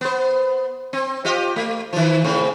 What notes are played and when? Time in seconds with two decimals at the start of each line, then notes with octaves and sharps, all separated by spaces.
0.01 B3 C5
0.93 C4
1.25 F4 G4 D#5
1.56 A3
1.93 D#3 F3
2.24 A2 C#3 C4